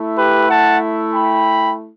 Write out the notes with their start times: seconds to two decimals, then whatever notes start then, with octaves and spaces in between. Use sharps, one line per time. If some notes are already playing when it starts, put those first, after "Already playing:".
Already playing: A3 E4
0.17 G4 B4
0.48 F#5 A5
1.15 G5 B5